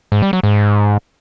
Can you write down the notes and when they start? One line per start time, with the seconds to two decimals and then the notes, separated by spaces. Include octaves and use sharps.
0.12 G#2
0.22 G3
0.33 F#3
0.43 G#2